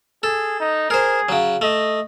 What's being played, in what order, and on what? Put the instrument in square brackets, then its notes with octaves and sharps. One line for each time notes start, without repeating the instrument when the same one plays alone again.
[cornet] G#4 [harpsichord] A4
[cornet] D#4
[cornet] G#4 [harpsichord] A#4 C5
[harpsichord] C#3 F#3
[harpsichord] A3 [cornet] D#5